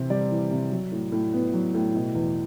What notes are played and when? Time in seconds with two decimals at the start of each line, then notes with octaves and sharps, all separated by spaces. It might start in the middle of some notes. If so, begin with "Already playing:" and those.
Already playing: C3 E3 C4
0.10 G3 D5
0.30 E3
0.51 C3
0.71 F#3
0.92 A2
1.12 A2
1.33 B3
1.53 F#3
1.74 A2
1.94 B2
2.15 E2